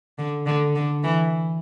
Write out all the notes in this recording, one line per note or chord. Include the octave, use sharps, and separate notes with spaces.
D3
D3
D3
E3